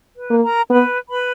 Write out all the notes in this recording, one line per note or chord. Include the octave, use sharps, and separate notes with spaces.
B4
A#3
A#4 A#5
B3 B4 B5
B4 B5